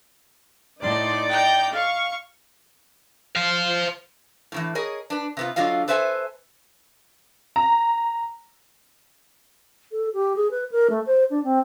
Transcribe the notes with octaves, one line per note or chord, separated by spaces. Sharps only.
A2 D#4 D5 C6
G5 A#5 G6
F5 C#6
C5 F5
A2 C#3 E3
G#4 A#4 C#5 D#5
D4 B4
C3 B3 F4
D3 F#3 F4 D#5 F5
A4 B4 C5 E5 G5 G#5
A#5
A4
G4
G#4
B4
A#4
A3
C5
D4
C4